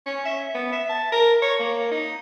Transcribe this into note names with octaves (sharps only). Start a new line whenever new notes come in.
C#4
E5
B3
E5
A5
A#4
C#5
A#3
D#4